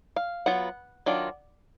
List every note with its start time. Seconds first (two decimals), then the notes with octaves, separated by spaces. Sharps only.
0.16 F5
0.46 F#3 B3 F4 F#5
1.06 D#3 F#3 D4 F4